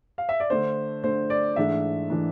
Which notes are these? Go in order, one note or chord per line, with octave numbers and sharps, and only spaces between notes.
F5
E5
D5
D3 A3 D4 C5
D3 A3 D4 C5
D5
G#2 E3 A3 D4 E5
E3 A3 D4